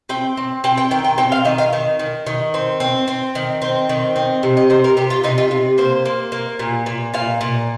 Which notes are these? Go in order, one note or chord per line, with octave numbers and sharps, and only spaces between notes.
C4 G5
C4
C4 G5
G5
D#3 G5
G5
C4 G5
F5
D#3 D#5
F5
D#3
D#3
D#3
C4
C4
C4
D#3
C4
D#3
C4
C3
D#5
C3 C5
A#4
C3 G4
F4
C3 D#4
F4
C3
A#3 C5
A#3
A#3
A#2
A#2
A#2 F5
A#2